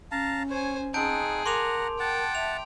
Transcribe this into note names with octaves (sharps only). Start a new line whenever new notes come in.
C#4 F5 A5 A#5
C5 C#5 G#5
C4 D#4 G#4 F#5 A5 G6 D7
A#4 F#5 A#5 C6 D6 F7
F#5 G5 A5
E5 F7